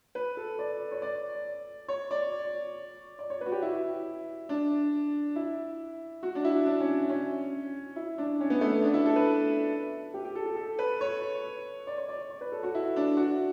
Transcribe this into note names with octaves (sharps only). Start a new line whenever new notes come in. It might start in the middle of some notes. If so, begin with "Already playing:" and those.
B4
A4
D5
C#5
D5
C#5
D5
D5
C#5
B4
F#4
G4
E4
D4
E4
F#4
D4
E4
D4
C#4
C#4
E4
D4
C#4
B3
A3
B3
D4
E4
A4
B4
G4
G4
A4
A4
A4
B4
C#5
D5
C#5
D5
C#5
B4
A4
F#4
E4
D4
F#4